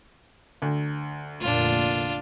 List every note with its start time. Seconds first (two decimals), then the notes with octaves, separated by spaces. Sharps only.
0.62 D2
1.41 F1 A#2 D3 D4 F4